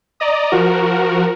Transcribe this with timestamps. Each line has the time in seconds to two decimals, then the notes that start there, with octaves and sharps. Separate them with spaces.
0.20 D5 D#5 A#5 D#6
0.51 F3 F#4 A#4